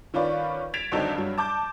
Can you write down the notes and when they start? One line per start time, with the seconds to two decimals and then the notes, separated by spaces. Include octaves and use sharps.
0.14 D#3 C#4 F4 B4 D5
0.74 G#6 A6 B6 D7 E7 F7
0.92 C#2 D3 F#3 C4 D#4 A4
1.15 G2 F#3
1.38 A5 D6 G6